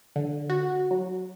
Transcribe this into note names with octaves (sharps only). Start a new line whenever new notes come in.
D3
F#4
F#3